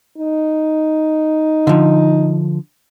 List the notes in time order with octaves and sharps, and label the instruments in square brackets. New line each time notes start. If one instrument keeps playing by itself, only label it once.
[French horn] D#4
[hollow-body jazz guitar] D3 F3